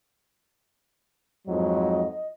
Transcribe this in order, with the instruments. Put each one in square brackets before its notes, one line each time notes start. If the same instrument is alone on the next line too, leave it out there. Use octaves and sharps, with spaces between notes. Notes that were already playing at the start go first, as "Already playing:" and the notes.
[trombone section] F2 G#2 F#3 [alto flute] D#5